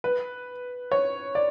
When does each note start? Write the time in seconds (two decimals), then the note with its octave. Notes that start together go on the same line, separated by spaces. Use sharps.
0.04 B4
0.92 C#5
1.35 D5